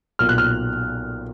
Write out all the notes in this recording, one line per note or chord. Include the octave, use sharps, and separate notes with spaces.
B1 A#2 F6
F#6
F6